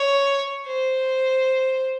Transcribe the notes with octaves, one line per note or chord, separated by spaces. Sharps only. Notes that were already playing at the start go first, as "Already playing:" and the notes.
Already playing: C#5
C5